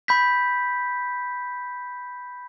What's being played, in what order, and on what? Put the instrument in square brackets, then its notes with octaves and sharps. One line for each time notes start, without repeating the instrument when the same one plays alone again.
[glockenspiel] B5 G6 B6